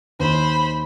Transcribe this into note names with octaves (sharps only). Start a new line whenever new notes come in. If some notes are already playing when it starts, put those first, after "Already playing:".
D#2 D#3 C5 B5